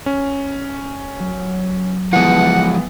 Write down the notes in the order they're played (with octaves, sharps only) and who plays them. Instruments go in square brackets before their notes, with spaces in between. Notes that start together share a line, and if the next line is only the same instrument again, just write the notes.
[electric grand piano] C#4
[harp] F#3
[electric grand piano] E3 B3 [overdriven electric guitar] F3 G#3 [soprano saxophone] F#5